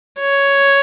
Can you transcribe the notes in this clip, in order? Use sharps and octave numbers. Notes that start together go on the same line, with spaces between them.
C#5